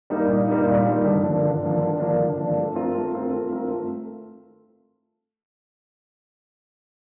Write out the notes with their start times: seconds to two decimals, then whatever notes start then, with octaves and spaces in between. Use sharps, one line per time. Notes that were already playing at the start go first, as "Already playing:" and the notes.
0.10 G3 A#3 D#4
0.28 A#2
0.47 G3 A#3 D#4
0.67 A#2
0.86 G3 A#3 D#4
1.05 D3
1.23 F3 A#3 D4
1.43 D3
1.62 F3 A#3 D4
1.81 D3
2.00 F3 A#3 D4
2.19 D3
2.38 F3 A#3 D4
2.57 A3
2.75 C4 F4 A#4
2.95 A3
3.14 C4 F4 A#4
3.33 A3
3.52 C4 F4 A#4
3.71 A3